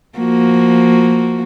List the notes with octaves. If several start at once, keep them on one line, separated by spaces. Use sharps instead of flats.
F3 A#3 F#4